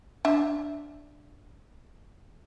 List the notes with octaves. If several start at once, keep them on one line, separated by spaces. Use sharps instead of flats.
D4 E5